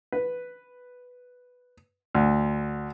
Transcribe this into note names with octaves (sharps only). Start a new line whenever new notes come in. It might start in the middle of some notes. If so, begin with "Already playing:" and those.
B4
D2